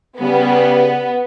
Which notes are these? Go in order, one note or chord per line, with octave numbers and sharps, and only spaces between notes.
C#3 G3 B3